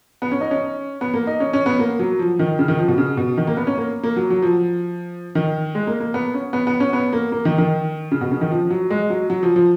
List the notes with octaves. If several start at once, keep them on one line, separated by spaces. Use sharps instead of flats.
B3
C#4
D#4
C#4
B3
A#3
D#4
C#4
C#4
B3
A#3
F#3
F3
D#3
C#3
D#3
F3
B2
C#3
B2
D#3
A#3
B3
C#4
A#3
A#3
F#3
F#3
F3
D#3
G#3
A#3
A#3
B3
C#4
B3
B3
C#4
B3
A#3
A#3
D#3
D#3
C#3
B2
C#3
D#3
F3
F#3
G#3
F#3
F#3
F3
F3